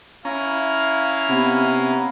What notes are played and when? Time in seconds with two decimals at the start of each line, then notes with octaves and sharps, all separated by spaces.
0.25 C#4 E4 F5 A#5
1.29 C3 B3